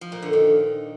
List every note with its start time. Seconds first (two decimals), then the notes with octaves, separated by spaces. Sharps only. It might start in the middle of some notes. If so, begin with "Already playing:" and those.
0.01 F3
0.12 A#2
0.22 D3
0.33 D#3